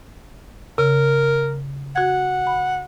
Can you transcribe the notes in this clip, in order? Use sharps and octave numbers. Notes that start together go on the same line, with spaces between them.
C#3 A#4
F#4 F#5 G#6
B5